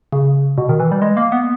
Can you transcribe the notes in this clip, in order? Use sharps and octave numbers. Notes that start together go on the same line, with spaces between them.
C#3
B2
D#3
E3
G3
G#3
A#3
B3